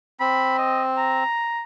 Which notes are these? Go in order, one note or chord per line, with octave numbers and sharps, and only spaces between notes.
C4 B5
D#5
A#5